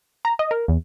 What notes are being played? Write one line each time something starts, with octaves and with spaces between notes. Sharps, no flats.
A#5
D#5
A#4
E2